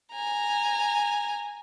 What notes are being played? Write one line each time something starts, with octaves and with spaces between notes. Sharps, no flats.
G#5 A#5